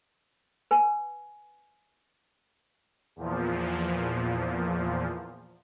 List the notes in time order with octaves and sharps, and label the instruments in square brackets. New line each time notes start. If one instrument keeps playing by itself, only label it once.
[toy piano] B4 G#5
[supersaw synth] E2 A#2 F3